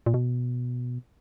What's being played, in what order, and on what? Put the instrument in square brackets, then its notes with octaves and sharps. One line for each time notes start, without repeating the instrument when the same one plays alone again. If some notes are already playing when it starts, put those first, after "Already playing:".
[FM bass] A#2
B2